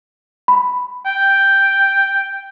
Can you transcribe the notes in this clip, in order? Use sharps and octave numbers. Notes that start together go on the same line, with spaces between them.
B5
G5